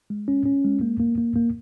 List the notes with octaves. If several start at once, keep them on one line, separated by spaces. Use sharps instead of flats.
G#3
C#4
C#4
G#3
A#3
A#3
A#3
A#3